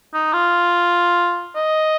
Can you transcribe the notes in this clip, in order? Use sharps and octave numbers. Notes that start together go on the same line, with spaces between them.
D#4
F4
D#5